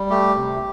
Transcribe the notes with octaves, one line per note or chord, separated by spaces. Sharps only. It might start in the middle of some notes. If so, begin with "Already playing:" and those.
Already playing: G3
A3 G4
C3